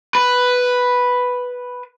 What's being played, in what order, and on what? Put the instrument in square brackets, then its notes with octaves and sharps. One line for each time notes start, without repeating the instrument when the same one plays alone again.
[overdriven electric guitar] B4